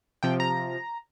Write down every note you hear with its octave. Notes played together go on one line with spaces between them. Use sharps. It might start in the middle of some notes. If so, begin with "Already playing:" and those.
C3 F3 G5
A#5